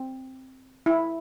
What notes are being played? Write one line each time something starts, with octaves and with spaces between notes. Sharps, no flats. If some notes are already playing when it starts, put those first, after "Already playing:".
Already playing: C4
E4